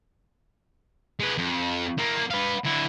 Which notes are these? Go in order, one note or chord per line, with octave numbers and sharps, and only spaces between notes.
G#3 B4
F2
A#3 E4
B4 F5
D3 E4